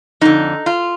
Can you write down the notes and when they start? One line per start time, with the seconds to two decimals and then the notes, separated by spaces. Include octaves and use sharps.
0.21 F2 D3 D#4
0.66 F4